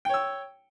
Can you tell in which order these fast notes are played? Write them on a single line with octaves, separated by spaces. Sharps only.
G5 C#5 E6